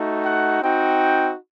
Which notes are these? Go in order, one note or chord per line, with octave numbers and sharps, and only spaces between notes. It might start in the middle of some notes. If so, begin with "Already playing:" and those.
Already playing: A3 D#4 F#4
F#5
C4 D#4 F#4 G5